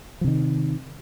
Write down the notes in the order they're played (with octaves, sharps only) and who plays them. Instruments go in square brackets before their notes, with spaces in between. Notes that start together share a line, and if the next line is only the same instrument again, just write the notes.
[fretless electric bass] F3
C3
D#3